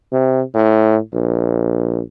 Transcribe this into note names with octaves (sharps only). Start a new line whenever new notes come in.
C3
A2
A#1